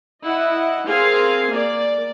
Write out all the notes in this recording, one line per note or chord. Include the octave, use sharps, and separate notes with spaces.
E4 D#5 F#5
C4 G#4 A#4 F5 G#5
A#3 D5